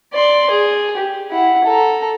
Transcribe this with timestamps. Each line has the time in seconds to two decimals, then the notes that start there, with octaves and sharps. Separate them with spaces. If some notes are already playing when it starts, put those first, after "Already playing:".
0.13 D5 C6
0.50 G#4
0.97 G4
1.31 E4 F#5
1.64 A4 A#5